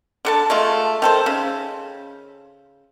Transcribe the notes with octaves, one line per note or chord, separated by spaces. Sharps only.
D3 A4 A5
G#3 A3 F4
D#3 A4 C5
C#3